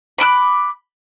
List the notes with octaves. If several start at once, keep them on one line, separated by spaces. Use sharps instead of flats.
B5 D6 E6 F#6